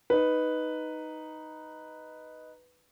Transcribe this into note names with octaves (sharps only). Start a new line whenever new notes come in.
D#4 B4